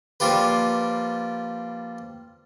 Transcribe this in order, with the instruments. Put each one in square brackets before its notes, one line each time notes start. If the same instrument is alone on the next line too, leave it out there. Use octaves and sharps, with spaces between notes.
[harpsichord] F3 G3 A#3 F4 G4 B4